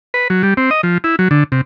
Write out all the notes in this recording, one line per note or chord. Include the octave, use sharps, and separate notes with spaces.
B4
F#3
G3
C4
D#5
F3
E4
F#3
D3
C3